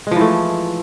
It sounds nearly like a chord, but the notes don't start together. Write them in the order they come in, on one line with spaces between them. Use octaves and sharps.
G#3 F3 E3 A3